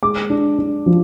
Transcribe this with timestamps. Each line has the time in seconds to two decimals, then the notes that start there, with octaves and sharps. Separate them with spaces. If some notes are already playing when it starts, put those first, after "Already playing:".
0.03 G#3 D6
0.30 D4
0.59 D4
0.86 F3